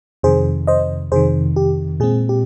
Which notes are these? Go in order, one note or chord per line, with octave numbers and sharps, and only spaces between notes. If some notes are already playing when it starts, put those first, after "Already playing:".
F2 C3 D#3 G#4 C5
C5 D#5
F2 C3 D#3 G#4 C5
G4
A#2 G#3 C4 G#4
G4